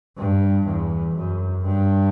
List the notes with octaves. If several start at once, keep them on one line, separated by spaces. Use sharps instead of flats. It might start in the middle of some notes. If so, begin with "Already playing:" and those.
G2
E2
F#2
G2